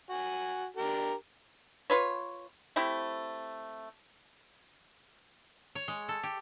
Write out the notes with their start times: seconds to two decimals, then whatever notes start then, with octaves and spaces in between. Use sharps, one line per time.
0.10 F#4 G#5
0.77 D4 G4 A#4
1.90 F4 B4 C#5
2.76 A3 C4 E4 G4
5.75 C#5
5.88 G#3
6.09 A4
6.23 G4